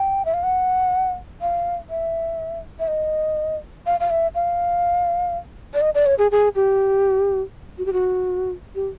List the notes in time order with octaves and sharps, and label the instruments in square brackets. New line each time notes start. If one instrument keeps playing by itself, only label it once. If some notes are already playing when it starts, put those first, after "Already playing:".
Already playing: [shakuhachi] G5
E5
F5
F#5
F5
E5
E5
D#5
F5
F5
E5
F5
D5
D#5
D5
C#5
G#4
G#4
G4
F#4
G4
F#4
G4